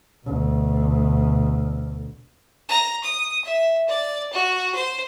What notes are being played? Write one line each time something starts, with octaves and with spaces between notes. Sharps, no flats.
D2 B2
A#5
D#6
E5
D5
F#4
C5